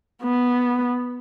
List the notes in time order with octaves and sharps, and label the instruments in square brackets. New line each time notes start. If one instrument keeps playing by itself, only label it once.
[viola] B3